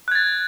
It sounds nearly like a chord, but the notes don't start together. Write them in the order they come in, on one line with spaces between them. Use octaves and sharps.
F#6 G#6 A6